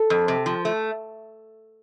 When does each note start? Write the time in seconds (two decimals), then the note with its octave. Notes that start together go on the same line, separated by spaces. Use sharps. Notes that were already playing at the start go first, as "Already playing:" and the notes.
Already playing: A4
0.10 F2
0.28 C3
0.46 F3
0.65 A3